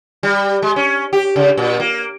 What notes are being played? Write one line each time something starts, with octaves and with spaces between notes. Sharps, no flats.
G3
G#3
C#4
G4
C#3
A#2
A#3